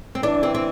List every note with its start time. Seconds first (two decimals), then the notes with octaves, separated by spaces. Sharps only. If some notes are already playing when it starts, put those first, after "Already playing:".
0.15 C4
0.22 E3 D4
0.43 C4
0.55 C4